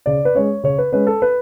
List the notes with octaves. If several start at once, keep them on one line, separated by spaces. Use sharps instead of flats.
C#3 D5
B4
G#3 C#4 C#5
C#3 C#5
B4
G#3 C#4 B4
A4
B4